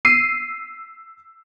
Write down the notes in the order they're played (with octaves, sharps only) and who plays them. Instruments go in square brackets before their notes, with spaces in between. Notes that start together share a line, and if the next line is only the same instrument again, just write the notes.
[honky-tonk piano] E6 B6 C7 D#7